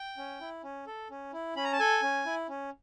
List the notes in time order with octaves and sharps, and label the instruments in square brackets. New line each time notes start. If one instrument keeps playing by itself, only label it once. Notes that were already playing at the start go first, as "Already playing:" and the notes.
Already playing: [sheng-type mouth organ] G5
C#4
E4
C#4
A4
C#4
E4
C#4 B5
A#5
A5
A4 G#5
C#4
E4
C#4